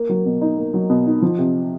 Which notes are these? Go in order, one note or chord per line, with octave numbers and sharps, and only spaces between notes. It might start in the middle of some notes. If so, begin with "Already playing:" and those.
Already playing: A#3
F#3
B2
D#4
A#3
F#3
B2
D#4
F3
C3